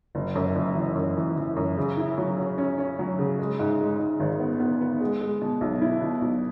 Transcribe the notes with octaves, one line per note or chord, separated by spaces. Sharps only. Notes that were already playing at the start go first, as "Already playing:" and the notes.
F#1
F#2
F#1
E3
F#2
E3
E3
F#2
C#3
E4
F#3
C#4
C#4
C#4
F#3
C#3
G#3
G#2
G#3
G#2
G#1
B3
B3
B3
G#3
G#3
B2
B1
E4
B2
B1